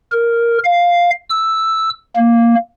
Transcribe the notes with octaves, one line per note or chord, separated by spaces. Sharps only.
A#4
F5
E6
A#3